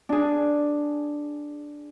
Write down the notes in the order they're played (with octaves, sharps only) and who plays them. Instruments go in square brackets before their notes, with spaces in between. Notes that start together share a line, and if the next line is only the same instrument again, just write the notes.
[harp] D4 G#4